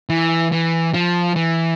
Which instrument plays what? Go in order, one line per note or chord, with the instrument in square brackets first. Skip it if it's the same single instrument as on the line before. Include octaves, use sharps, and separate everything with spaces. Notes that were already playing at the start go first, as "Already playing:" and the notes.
[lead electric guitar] E3
E3
F3
E3